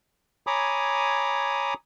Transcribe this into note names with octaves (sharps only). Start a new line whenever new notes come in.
C#5 G#5 A#5 B5 D6 D#6